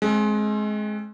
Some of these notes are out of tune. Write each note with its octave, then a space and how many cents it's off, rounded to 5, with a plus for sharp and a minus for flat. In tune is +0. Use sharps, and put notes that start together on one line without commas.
G#3 +25 C4 +45